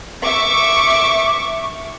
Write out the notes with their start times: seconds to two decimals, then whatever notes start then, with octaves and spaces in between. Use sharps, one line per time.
0.24 E5 C#6 D6